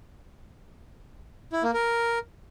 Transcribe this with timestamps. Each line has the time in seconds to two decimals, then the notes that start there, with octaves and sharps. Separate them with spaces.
1.52 E4
1.63 A#3
1.74 A#4